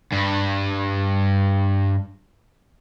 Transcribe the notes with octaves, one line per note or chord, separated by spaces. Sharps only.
G2